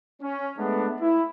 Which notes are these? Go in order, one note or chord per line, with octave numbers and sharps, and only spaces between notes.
C#4
G#3 A3 B3 D4
E4